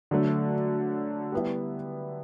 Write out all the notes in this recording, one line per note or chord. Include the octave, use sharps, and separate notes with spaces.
D3 F#3 A3
G3 B3 E4